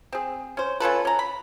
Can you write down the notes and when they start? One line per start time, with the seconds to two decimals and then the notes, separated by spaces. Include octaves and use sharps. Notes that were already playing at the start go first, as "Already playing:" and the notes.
0.13 C4 G#4
0.57 C#4 C5
0.80 C#4 F4 A4 B4
1.05 C#4 A#5
1.19 B5